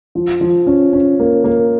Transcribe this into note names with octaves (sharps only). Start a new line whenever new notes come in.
F3
F3
C#4
C#4
A#3
A#3